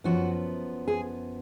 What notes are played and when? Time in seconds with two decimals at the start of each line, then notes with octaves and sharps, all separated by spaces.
0.04 F#2 F3 B3 F#4
0.88 G#4